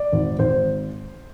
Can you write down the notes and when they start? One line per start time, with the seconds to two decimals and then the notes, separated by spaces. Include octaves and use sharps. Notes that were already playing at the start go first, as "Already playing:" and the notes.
Already playing: D5
0.12 G#1
0.39 G#1 C5